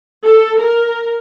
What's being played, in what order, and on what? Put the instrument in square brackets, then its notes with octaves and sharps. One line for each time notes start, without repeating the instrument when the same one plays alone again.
[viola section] A4
A#4